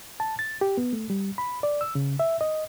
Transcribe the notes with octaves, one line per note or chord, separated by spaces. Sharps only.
A5
A6
G4
B3
A3
G3
B5
D5
E6
C#3
E5
D#5